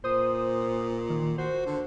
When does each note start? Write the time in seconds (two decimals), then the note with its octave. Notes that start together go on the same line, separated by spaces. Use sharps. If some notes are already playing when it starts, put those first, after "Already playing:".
0.04 A#2 C5 D#6
1.10 D#3
1.38 F#4 C5
1.66 D3